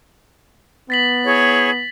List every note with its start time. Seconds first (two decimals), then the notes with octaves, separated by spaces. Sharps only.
0.90 B3 A6 B6 F#7
1.24 E4 G#4 C#5